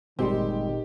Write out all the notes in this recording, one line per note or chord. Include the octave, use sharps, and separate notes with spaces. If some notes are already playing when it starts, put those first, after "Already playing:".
G1 A#2 D#3 G3 G#3 C4 G4